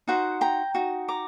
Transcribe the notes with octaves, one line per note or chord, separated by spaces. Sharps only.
D#4 F#4 C5 F#5
G5 A#5
D#4 F#4
A#5 D6